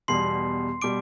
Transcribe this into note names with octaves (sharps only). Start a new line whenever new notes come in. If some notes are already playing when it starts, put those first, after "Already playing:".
E2 B2 G3 C6 C7
B2 G3 D6 D7